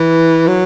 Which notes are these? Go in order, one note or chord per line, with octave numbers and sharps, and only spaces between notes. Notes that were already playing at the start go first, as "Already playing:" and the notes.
Already playing: E3
F#3